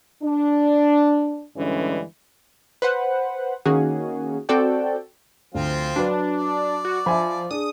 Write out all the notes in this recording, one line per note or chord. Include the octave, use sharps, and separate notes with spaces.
D4
G2 D3 E3 G3 G#3 C#4
B4 C5 F#5
D#3 A#3 C#4 F#4 G#4
C4 F#4 A4 D5 G5
D2 F3 C4 F4
F#3 D4 B4
D5
F#4
F3 E5 G#5 B5
D4 G#4 D#6